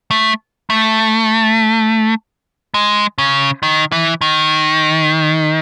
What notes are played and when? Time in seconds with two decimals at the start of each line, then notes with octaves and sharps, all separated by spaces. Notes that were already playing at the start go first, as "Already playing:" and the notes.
0.11 A3
0.70 A3
2.74 G#3
3.18 C#3
3.63 D#3
3.92 E3
4.21 D#3